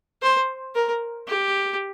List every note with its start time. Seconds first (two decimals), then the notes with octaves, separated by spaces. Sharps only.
0.22 C5
0.75 A#4
1.28 G4